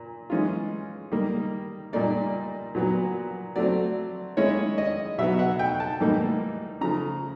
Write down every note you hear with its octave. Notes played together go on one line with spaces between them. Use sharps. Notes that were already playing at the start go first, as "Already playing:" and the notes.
Already playing: A#2
E3 G#3 C#4 F4
D#3 G3 A#3
A#2 G3 A#3 D#4 D5
A#2 F#3 B3
F#3 A3 C4 D5
D#3 G#3 C#4 E4 C#5
D#5
B2 F#3 B3 E5
F#5
G5
A5
A2 E3 G3 A#3 D#4
C#3 F3 A3 A#5